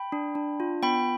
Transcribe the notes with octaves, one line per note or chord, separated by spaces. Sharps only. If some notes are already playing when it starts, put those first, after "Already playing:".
Already playing: G5 B5
D4
D4
F4
B3 G5 B5